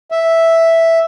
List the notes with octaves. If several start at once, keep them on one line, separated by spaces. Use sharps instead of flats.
E5